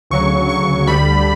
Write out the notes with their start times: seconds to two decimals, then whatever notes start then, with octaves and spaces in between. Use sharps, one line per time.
0.10 D2 C#3 F#3 C#6
0.49 C#6
0.87 D2 D3 G3 B5